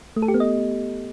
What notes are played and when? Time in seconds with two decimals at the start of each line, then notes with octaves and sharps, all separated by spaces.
0.16 A3
0.22 A4
0.28 G4
0.34 B3
0.40 D#5